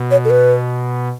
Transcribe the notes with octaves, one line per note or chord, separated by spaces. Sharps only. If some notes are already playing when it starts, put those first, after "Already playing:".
Already playing: B2
C#5
A4
B4